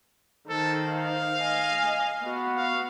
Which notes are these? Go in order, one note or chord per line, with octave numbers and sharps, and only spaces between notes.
D#3 A4 C5
F5
D#5 G#5
B3 F#4
F5